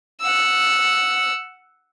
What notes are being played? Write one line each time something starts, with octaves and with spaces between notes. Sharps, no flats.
F#5 E6